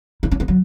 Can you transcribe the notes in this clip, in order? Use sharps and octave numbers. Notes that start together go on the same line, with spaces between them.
E4
C#4
B3
F#3